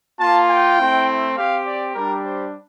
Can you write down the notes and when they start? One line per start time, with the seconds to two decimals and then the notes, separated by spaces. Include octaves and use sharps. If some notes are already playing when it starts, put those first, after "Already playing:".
0.19 A#3 F4 A5
0.48 G5
0.77 A3 C4 E4
1.36 C4 G4 F5
1.65 D5
1.94 G3 D4 G4 A#4
2.24 C5